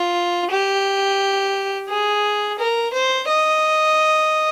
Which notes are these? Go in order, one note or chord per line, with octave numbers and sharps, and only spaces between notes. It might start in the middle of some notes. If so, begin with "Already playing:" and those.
Already playing: F4
G4
G#4
A#4
C5
D#5